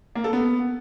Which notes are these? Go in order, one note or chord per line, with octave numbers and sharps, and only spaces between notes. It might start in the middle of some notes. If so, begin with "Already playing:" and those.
A#3
A4
B3